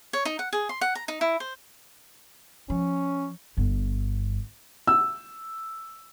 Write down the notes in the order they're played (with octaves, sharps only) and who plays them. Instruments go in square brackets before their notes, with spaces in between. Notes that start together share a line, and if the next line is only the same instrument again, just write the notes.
[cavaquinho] C#5
D#4
F#5
G#4
C6
F#5
A#5
D#4
E4
C5
[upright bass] F3 [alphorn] C#4
[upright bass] G1 G2
[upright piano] E6